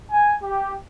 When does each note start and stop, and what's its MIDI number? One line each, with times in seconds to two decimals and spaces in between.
0.10 0.32 80
0.43 0.72 67